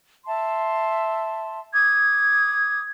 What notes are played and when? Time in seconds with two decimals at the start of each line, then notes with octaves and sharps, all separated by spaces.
0.25 E5 A5 C6
1.74 D6 D#6 G#6